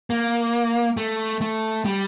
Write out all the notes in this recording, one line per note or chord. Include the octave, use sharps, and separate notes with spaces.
A#3
A3
A3
G3